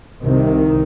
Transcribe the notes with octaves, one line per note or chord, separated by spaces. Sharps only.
C2 C3 D#3